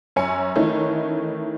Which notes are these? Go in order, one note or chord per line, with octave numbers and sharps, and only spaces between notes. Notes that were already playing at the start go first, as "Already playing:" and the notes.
F#2 C#4 G#5 C#7
D#3 E3 A3 C#4 D#4